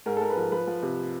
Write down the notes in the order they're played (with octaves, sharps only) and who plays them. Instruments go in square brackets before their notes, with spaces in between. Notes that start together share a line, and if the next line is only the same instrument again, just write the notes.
[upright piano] G#2 A#4
A4
G#2 A#4
B4
F3 A#4
F3 B4
F3
C3